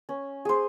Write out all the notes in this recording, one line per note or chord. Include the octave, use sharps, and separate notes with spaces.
C#4
G#4 C5